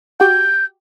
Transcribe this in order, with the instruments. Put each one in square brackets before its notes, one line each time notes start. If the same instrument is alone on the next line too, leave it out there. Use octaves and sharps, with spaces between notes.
[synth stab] F#4 G4 [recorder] G6